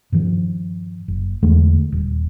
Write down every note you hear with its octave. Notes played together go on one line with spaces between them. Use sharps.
G2 D#3 F3
F#1
E2 D3 G#3 A3
D#1